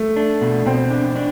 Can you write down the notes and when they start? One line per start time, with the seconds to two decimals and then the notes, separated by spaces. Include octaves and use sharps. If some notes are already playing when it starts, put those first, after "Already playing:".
Already playing: A3
0.16 D4
0.41 B2
0.66 B2 C4
0.90 D4
1.15 D4